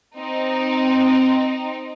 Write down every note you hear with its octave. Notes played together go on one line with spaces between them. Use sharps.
C4 D#4